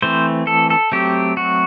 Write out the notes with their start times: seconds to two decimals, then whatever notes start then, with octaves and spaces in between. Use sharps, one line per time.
0.02 E3 A3 C4 C5
0.47 A4
0.70 A4
0.92 F#3 A3 C4 G4
1.37 F#4